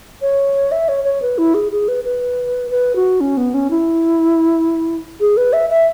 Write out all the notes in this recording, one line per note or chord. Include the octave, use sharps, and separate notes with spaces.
C#5
E5
C#5
C#5
B4
E4
G#4
G#4
B4
B4
B4
F#4
C#4
B3
C#4
E4
G#4
B4
E5
E5